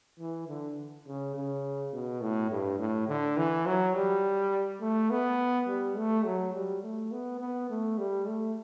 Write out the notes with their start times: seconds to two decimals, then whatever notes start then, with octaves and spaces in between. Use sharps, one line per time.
0.19 E3
0.48 D3
1.07 C#3
1.35 C#3
1.93 B2
2.21 A2
2.51 G2
2.79 A2
3.08 D3
3.37 E3
3.66 F#3
3.95 G3
4.81 A3
5.10 B3
5.68 G3
5.97 A3
6.25 F#3
6.54 G3
6.83 A3
7.12 B3
7.40 B3
7.70 A3
7.98 G3
8.27 A3